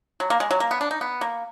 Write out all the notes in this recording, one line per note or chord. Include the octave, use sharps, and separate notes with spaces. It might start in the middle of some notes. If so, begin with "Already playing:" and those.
F#3
A#3
G#3
F#3
A#3
B3
D4
D#4
B3
A#3